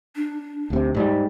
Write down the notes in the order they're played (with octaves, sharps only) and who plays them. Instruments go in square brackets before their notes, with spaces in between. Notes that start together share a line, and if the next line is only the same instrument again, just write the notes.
[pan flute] D4
[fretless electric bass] D2 C3
G#2 G3